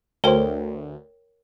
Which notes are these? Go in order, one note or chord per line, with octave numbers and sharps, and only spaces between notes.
D2 A4 A#4 C5 C#5 G5